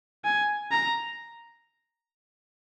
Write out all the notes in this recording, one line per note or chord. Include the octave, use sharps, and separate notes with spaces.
G#5
A#5